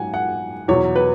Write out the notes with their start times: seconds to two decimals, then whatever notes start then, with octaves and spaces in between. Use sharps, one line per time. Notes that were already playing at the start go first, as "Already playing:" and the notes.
Already playing: G#2 F#3 F#5 G#5
0.14 F#5
0.68 E2 B2 F#3 C#5
0.96 B4